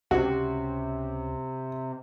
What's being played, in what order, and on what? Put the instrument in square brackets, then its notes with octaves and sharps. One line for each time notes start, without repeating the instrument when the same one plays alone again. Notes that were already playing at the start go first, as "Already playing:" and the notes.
[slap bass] C#2 C4 C#4 [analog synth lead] C3 [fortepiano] F#4